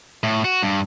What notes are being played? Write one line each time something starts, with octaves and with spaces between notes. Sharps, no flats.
A2
F#4
G2